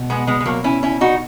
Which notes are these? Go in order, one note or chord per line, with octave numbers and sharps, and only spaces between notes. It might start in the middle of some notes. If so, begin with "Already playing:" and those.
Already playing: B2
G#3 B3
G#3 B3
G#3
F#3 A#3
C#4 E4
C#4 E4
D#4 F#4